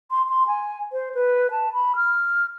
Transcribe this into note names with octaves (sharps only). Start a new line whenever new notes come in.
C6
C6
G#5
C5
B4
A5
B5
F6